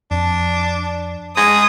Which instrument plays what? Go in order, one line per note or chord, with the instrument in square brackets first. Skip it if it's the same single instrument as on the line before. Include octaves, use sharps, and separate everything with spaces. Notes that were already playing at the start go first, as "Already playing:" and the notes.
[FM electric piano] F2 [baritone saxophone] D4
[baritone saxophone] G#3 [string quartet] D#6